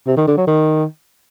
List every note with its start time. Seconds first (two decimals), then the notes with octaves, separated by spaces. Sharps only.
0.07 C3
0.17 D#3
0.27 D3
0.37 F#3
0.47 D#3